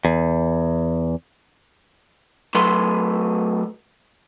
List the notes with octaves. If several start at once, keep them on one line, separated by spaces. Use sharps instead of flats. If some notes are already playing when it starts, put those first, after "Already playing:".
E2
F#3 A3 B4 C6